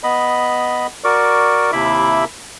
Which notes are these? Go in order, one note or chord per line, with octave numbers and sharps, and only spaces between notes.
B3 D#5 B5
F#4 A#4 D5 C#6 D6
D#2 C3 E4 E5 B5 D6